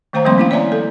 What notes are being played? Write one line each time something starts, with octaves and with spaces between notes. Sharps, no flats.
D#3 A3 C5 F5 A#5
F3 G3 A3 A#3 C4 C6
C#4 E4 F5
C#5 D5 E5 G#5 A#5
A4